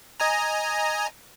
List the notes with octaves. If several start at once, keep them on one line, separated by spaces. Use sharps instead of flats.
D#5 G#5 A#5